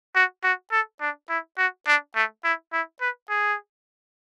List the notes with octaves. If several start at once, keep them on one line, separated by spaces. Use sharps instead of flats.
F#4
F#4
A4
D4
E4
F#4
D4
A3
E4
E4
B4
G#4